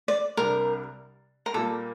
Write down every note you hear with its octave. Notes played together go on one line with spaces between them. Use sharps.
D5
C2 C3 G3 D4 A#4
A#4
A#2 G3 A#3 A4